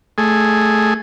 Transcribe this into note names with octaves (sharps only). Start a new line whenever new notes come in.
A3 G#4